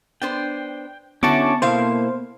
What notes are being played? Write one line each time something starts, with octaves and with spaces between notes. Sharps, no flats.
B3 D4 C5 G5
D3 B3 C#4 E4 F#4 A5 C#6 D6
B2 A#3 E4 A4 C5 F5